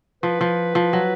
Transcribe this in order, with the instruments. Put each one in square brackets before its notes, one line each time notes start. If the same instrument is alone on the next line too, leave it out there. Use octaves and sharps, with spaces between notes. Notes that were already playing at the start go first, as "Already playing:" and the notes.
[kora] F3 [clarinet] B4
[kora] F3
F3
F#3